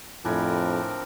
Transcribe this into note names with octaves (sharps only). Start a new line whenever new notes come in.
F2 A2 F3 C4 D4 A#4 G#5 B5